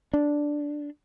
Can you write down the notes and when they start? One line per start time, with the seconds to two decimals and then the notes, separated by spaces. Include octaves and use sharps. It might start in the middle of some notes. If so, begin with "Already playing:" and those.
0.14 D4